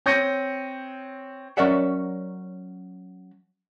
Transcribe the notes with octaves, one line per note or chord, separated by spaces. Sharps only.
C4 C#5 G6 A#6 C#7 D#7
F#3 C#4 A#4 D5 E5 F#5